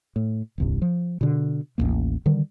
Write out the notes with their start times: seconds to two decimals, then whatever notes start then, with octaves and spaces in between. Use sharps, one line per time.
0.16 A2
0.58 D#1 C2 G2
0.82 F3
1.21 B2 D3
1.78 A1 D#2 B2 A#3
2.26 D3 D#3 G3